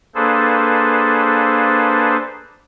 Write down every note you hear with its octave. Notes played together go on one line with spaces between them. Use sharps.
A#3 D4 G#4 A4 B4 C5